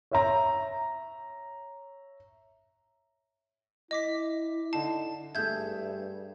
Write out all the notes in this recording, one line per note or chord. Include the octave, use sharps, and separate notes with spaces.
C#5 E5 A#5
E4 D#5 D6 B6
D3 D#4 A5 C7
G2 A3 G#4 E5 G6 G#6